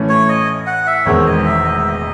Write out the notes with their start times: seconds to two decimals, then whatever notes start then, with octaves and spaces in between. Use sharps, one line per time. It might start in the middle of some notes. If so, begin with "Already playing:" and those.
Already playing: A2 E3 A3 C#4
0.09 C#5
0.29 D#5
0.67 F#5
0.87 E5
1.05 E1 E2 D#3 G#3 C4 C#5
1.26 D#5
1.45 E5
1.65 D#5
1.76 E5
1.87 D#5